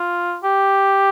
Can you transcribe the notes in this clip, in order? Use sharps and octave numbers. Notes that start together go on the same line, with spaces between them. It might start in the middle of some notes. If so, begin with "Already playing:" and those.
Already playing: F4
G4